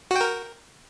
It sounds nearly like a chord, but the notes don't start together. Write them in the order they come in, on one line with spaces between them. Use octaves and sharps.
F#4 G5 A#4